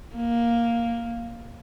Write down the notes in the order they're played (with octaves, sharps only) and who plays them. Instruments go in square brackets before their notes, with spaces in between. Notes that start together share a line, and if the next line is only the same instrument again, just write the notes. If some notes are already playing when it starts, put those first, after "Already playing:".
[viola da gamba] A#3